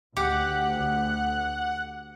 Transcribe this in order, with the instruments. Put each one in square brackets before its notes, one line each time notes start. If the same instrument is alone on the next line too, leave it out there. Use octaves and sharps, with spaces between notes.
[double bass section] D2 [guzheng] G4 [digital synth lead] F#5